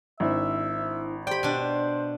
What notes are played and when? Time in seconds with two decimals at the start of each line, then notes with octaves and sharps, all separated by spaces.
0.20 G#1 D4 E4 C5 E5
1.27 G4 C5 D5 G5 B5
1.43 B2 D4